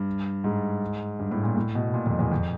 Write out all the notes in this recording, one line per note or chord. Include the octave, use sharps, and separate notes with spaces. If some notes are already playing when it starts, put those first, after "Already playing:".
Already playing: G2
G#2
G2
A2
A#2
A2
B2
A#2
F2
E2
F2